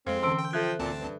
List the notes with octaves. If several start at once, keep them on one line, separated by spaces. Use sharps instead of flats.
F2 G#3 C4 A4 C5 F5
D3 E3 C#4 C6 E6 D7
G5
F3 A4 C5 E5 F#6
D2 A#2 C4 A5
G2